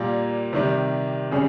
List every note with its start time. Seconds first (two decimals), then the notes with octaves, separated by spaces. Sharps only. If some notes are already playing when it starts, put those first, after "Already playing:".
Already playing: A#2 G3 A#3
0.53 C3 D#3 G3
1.31 C#3 G3 C#4 G#4